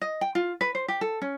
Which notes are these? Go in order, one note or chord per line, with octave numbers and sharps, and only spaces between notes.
D#5
G5
F4
B4
C5
G4
A4
C#4